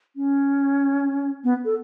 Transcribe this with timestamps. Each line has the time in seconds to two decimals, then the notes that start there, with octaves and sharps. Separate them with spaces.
0.16 C#4
1.44 B3
1.65 A4